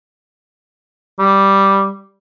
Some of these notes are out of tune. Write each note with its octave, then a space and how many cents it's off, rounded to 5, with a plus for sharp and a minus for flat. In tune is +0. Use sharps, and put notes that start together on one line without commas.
G3 -5